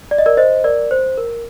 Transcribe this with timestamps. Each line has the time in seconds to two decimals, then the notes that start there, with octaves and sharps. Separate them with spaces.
0.11 D5
0.18 D#5
0.26 A#4 D5
0.37 C5 D#5
0.64 A#4 D5
0.91 C5
1.17 A#4